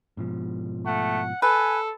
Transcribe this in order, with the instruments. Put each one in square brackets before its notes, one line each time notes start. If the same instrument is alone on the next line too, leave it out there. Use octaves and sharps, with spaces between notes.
[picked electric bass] G#2 B2 F3
[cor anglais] A3 [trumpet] F#5
[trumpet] A4 [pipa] B4 [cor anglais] G#5